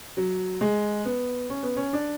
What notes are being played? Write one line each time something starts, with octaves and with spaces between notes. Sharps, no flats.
F#3
G#3
B3
C#4
B3
C#4
D4